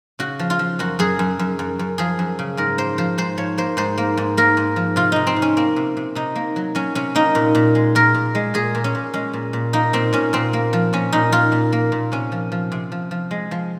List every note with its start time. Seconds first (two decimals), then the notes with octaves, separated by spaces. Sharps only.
0.19 C#3 F#4
0.39 F3
0.50 F4
0.59 F3
0.79 F#2 F#4
0.99 F#2 G#4
1.19 F#2
1.39 F#2
1.59 F#2
1.79 F#2
1.98 F3 G#4
2.19 F#2
2.39 C#3
2.57 G#2 A#4
2.78 A#3 C5
2.98 F3 C5
3.18 G#2 C5
3.37 F3 C#5
3.58 A#3 C5
3.77 G#2 C5
3.98 A#3
4.17 G#2
4.37 A#3 A#4
4.57 G#2
4.76 F3
4.96 C3 F4
5.12 C3 D#4
5.27 C4
5.36 C3
5.42 C#4
5.57 A#3 C4
5.76 C3
5.97 C3
6.15 C3 D#4
6.36 A#3
6.56 F#3
6.75 F#3 C#4
6.95 C3 C#4
7.15 A#3 D#4
7.35 A#2
7.55 A#2
7.75 G#3
7.95 A#2 A#4
8.15 A#2
8.35 G#3
8.54 A#2 G#4
8.75 A#2
8.84 C#4
8.95 A#2
9.14 G#3 C#4
9.33 A#2
9.53 A#2
9.73 A#3 D#4
9.93 A#2 C4
10.13 A#2 C#4
10.33 A#2 C4
10.53 A#3
10.73 F3
10.93 A#2 C#4
11.13 A#2 D#4
11.32 A#2 F4
11.52 A#2
11.72 A#3
11.92 A#2
12.12 C3 C#4
12.32 F3
12.52 F3
12.72 C3
12.92 F3
13.11 F3
13.31 G#3
13.51 F3